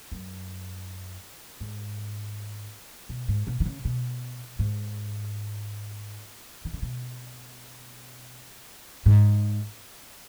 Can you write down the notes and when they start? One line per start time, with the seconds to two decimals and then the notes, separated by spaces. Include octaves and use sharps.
0.12 F#2
1.61 G#2
3.09 B2
3.28 G#2
3.47 B2
3.60 D#3
3.66 C#3
3.85 B2
4.59 G#2
6.65 D#3
6.73 C#3
6.82 B2
9.06 G#2